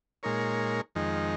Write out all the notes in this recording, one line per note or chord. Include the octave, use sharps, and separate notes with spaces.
A#2 G#3 D#4 A#4 C#5
F2 D#3 G#3 D#4